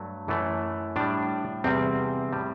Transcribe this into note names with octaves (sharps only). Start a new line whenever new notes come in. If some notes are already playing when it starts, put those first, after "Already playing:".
Already playing: G2 F#3 A3
F#2 E3 A3
A2 G3 D4
E2 C3 G3 C4
A2 G3